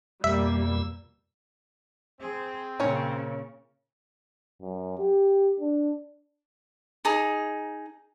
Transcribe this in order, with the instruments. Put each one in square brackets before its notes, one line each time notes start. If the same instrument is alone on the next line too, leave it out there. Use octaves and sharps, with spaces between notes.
[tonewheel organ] F2 B2 E6 [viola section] G3 A#3 [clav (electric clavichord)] E5
[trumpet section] C4 [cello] G#4
[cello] A#2 C#3 [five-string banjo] C#4 A#4 C#5
[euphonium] F#2
G4
D4
[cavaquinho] D#4 G#4 A#5